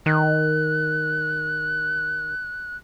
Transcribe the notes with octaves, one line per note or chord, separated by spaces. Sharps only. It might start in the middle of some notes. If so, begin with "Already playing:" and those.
D#3 F#6